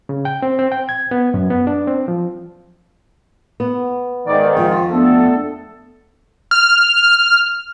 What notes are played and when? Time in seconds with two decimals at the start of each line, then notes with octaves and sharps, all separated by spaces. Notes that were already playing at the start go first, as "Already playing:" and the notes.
0.09 C#3
0.25 G5
0.42 C4
0.59 C4
0.72 G5
0.89 G#6
1.11 B3
1.34 F#2
1.50 B3
1.67 D4
1.87 C4
2.08 F3
3.60 B3
4.27 G#2 D#3 D5
4.57 F2 F4
4.91 A3 B3 D4 A4
6.51 F6